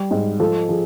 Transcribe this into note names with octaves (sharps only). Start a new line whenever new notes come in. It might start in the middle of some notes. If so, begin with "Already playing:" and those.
Already playing: G3
G#2
F3 A4
F3 G#4